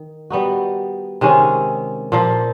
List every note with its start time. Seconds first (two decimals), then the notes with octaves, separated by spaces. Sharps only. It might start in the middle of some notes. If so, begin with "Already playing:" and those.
Already playing: D#3
0.30 G3 B3 D#4 F#4
1.21 C3 D#3 G#3 C#4
2.12 A#2 F3 A#3